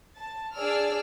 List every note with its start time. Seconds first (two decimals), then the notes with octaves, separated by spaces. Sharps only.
0.17 A5
0.55 D4 G#4 D5 E6 F6